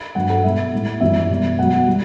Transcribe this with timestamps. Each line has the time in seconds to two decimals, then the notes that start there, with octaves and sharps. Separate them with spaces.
0.15 G2 F#3 F#5
0.30 A4
0.44 B2 G3 E5
0.73 A2 G3
1.01 F#2 E3 G3 E5
1.30 B2 G3
1.58 B2 F#3 F#5
1.87 G3